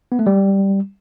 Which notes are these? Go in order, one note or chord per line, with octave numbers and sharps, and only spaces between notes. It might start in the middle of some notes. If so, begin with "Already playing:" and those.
B3
A3
G3